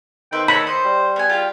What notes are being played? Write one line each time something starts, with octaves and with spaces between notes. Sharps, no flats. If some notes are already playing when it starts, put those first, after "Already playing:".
D#3 C4 B4 E5 G5
A4 A#4 C#5 B5
C5 D#5
G3
B3 G#5
F4 G4 G5